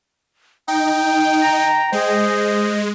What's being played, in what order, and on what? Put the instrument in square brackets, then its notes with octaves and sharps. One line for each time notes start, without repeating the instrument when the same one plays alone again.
[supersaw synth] D#4 [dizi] G5
[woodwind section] A#5
[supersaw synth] G#3 [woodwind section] G#4 C5 D#5